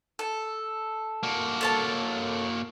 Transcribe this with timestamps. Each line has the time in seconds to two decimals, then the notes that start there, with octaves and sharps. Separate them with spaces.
0.19 A4
1.23 A#3 F#4
1.61 A4 C#5 A5